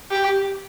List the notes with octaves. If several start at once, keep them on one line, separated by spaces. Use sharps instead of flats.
G4